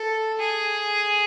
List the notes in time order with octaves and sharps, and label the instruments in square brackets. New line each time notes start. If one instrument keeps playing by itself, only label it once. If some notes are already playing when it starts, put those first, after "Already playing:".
Already playing: [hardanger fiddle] A4
G#4